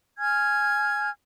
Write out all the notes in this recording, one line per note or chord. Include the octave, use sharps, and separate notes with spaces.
G#5 F6 G#6